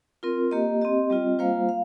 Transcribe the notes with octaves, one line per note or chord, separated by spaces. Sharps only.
C4 F4 A#4
A#3 G4 D#5
C4 G4 D#5
G3 C4 F4 D#5
G3 A#3 F4 C5 F5
F5